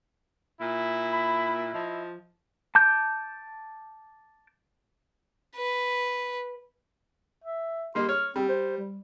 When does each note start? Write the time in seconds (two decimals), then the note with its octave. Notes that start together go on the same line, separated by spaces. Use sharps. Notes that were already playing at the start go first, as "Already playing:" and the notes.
0.61 A#2 E4
1.13 B5
1.74 F3 D#5
2.75 A5 D6 G6
5.56 B4
7.44 E5
7.95 G3 A#3 D#5 C6
8.09 C#5 F6
8.36 G3 C4
8.49 C5
8.78 G3